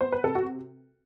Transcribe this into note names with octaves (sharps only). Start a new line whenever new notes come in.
B3 C5
B4
C3 A4
F#4